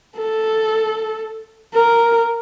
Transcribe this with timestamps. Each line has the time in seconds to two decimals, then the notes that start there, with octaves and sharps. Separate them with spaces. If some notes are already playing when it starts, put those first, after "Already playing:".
0.18 A4
1.74 A#4